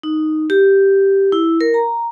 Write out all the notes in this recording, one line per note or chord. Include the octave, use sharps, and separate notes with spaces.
D#4
G4
E4
A#4
A#5